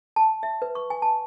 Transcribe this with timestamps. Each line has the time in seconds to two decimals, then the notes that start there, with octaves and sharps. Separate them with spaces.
0.16 A5
0.43 E5
0.62 B4
0.75 C#6
0.90 G#5
1.02 A5